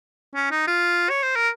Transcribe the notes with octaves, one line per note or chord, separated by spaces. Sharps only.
C#4
D#4
F4
C#5
C5
A#4